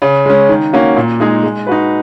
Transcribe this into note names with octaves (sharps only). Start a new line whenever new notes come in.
C#3
G#3 C#4
D#3
A#3 C#4 F#4
A#2
G#3 D#4 G#4
G#3
D#4 F#4 B4